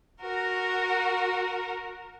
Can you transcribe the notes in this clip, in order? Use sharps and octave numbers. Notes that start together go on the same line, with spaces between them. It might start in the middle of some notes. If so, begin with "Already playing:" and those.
F#4 A#4